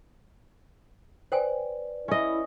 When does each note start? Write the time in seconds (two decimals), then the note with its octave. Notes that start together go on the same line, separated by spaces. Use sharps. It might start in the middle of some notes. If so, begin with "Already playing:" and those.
1.32 B4 C5 D5 G5 G#5
2.08 C#4 E4 D#5